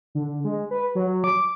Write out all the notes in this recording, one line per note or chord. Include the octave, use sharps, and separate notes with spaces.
D3
G#3
B4
F#3
D6